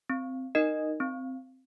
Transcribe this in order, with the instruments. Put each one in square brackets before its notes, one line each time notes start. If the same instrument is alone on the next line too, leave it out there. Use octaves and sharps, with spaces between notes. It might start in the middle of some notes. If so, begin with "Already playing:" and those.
[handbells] C4
D#4 A#4 D#5
C4